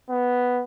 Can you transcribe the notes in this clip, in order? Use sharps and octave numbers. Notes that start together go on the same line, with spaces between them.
B3